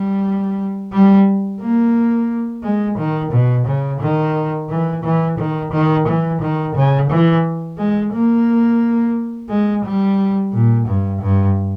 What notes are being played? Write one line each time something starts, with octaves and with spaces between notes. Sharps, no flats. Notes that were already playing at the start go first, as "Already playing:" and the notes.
Already playing: G3
G3
A#3
G#3
D#3
B2
C#3
D#3
E3
E3
D#3
D#3
E3
D#3
C#3
E3
G#3
A#3
G#3
G3
A#2
G2
G2